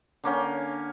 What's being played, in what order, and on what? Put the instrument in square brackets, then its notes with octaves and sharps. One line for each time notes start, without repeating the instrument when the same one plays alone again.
[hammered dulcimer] D3 A#3 C#4 G5